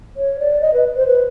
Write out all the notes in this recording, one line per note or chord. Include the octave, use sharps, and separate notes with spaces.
C#5
D5
D#5
B4
C5
B4